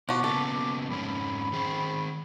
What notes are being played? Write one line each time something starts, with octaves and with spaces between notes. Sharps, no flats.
B2 F3 F#4 D6
C#3 A#3 B3 A4
D6
F2 G#2 C#4 B5
D#3 G#4 C5